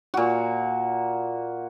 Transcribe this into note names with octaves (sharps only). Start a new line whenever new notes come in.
A#2 F#4